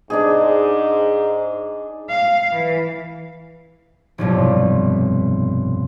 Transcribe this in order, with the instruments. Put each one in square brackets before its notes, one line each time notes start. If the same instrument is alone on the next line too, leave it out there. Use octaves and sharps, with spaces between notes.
[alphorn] G#2 [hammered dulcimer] D4 D#4 G#4
[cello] F5
E3
[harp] F1 B1 G2 F4